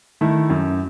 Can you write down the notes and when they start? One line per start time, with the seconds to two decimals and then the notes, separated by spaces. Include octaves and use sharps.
0.21 D#3 A3 E4
0.50 F#2